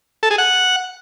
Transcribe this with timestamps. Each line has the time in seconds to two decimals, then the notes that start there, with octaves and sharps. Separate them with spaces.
0.23 A4
0.31 G#4
0.38 F#5